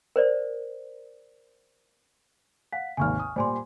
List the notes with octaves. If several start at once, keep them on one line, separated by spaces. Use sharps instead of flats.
A#4 C5 D5
F5 F#5 B6
G#1 D#2 C3 G#5 C#6 F6
D#6
A#2 G3 C5 G#5 C6